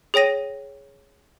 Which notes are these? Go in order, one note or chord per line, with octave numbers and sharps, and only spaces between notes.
G#4 C#5 G5 A#6 D#7